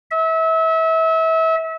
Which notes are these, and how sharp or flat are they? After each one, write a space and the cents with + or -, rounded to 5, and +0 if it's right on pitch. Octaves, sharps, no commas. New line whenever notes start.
E5 -30